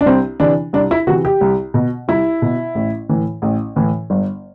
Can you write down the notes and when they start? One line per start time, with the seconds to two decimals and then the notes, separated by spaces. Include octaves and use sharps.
0.01 D4
0.06 C2 C4
0.40 C3 E3 D4
0.73 C2 D4
0.91 E4
1.07 C3 E3 F#4
1.25 G4
1.41 C2
1.74 B2
2.08 C2 E4
2.42 B2
2.75 A1
3.09 A2 E3
3.42 A1
3.76 A2 E3
4.10 G1